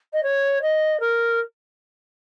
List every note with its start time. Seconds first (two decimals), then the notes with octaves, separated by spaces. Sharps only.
0.13 D#5
0.23 C#5
0.62 D#5
1.00 A#4